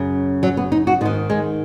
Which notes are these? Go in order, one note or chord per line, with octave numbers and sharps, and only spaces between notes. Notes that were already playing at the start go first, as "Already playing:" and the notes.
Already playing: F#2 C#3
F#3
B3
D#4
F#4
G#2 D#3 B3
G#3